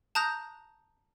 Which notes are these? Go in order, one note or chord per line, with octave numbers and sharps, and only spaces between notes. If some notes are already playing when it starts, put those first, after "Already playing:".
A5 A#5 D#6 F#6 G6 A#6